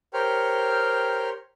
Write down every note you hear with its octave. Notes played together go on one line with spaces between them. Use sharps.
G4 A#4 C5 C#5 G5 F6